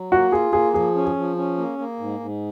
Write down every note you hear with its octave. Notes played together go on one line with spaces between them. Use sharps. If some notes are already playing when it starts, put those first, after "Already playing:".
Already playing: F#3
A#3 F#4
F4 G#4
A#3 G#4
F3 G#4
C#4
G#4
F3
C#4
A#3
A#3
G#2
G#2